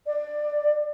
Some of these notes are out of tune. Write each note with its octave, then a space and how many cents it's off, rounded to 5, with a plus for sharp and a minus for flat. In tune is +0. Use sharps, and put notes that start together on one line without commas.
D5 +15